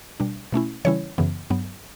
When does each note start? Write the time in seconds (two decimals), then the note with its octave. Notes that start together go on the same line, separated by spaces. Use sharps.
0.20 B2 G3 D4
0.52 B2 A3 C#4 E4
0.85 C#3 E3 G3 C#4 E4 C#5
1.18 F#2 C#3 E3 B3
1.50 G2 F#3 B3